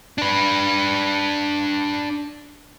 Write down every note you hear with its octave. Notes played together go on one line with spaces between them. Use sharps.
D4 B4